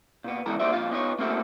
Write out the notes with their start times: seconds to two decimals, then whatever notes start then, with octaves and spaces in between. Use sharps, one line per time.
0.24 A#2 B3
0.46 C#2 G#2 E3 B3 A4 A#5
0.60 A#3 D#4 F#4 C5 D5 E5
0.73 F2 A#2 F4 F5
0.91 B3 D#4 F4 C#5
1.19 A3 A#3 C4 E4 F#4 A4